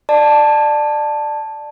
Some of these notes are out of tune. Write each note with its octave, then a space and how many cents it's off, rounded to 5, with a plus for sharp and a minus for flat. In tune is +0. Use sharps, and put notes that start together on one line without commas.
D5 +20 A5 +0